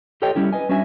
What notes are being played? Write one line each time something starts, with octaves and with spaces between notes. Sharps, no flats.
F4 G4 A4 C#5 D#5 G5
G3 C#4 E4 G4
B4 D#5 G#5
G3 C#4 D4 F#4 E5 G#5